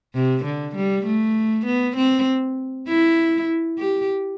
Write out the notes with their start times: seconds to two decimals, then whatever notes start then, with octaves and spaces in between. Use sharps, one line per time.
0.15 C3
0.45 D3
0.76 G3
1.06 A3
1.66 B3
1.97 C4
2.88 E4
3.79 G4